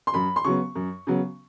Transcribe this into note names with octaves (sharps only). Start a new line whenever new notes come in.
C6
F#2 B5
C6
C#3 F#3 B3 C#6
F#2
C#3 F#3 B3